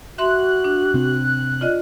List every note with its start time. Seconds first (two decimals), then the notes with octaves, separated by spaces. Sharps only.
0.18 F#4 E5 C6 F#6
0.64 D4
0.94 C3 C4
1.61 F4 D5 D#5